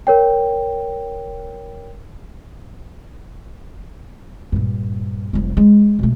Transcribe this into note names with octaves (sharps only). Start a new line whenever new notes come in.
A#4 C#5 G5
G2 A#2
F1 G3
G#3
B2 A3